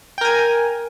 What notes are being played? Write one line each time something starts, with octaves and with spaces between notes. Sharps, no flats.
A#4 G5 G#5